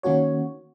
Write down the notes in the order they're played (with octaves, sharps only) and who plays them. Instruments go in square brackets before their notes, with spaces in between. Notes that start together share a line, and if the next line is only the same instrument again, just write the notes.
[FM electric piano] D#3 A#3 C#4 F#4 C#5